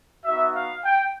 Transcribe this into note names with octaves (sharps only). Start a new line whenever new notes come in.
B3 D#4 F#4 E5
F5
G5